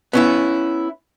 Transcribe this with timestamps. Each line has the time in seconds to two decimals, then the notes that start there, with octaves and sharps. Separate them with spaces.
0.13 B3 C#4 E4